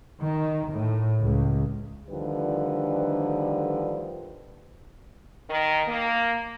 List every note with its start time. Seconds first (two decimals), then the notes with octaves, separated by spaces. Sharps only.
0.21 D#3
0.72 A2
1.21 C#2
2.08 D2 D3 D#3 F3 G3 B4
5.49 D#3
5.87 A#3